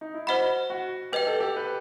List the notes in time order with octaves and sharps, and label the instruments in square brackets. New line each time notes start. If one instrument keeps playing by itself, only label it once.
[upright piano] D#4
E4
[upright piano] F#4 [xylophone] C5 D#5 F#5 B5
[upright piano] F#4
[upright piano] G4 [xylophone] B4 D#5 G5
[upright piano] A4
G4
B4